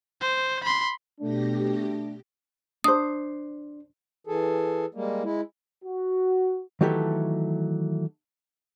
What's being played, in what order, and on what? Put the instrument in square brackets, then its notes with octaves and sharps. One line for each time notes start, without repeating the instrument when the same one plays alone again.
[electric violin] C5
B5 C6
[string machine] B2 G4 A#6 [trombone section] A3 D4
[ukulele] D4 C5 [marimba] D#6
[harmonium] E3 G#4 A4
G3 G#3 A#3
G#3 E4
[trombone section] F#4
[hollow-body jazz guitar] D#3 E3 F#3 A3 G4 A4